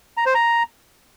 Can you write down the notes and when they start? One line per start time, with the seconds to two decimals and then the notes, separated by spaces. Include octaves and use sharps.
0.17 A#5
0.26 C5
0.35 A#5